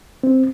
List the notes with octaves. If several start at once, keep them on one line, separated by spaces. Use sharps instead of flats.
C4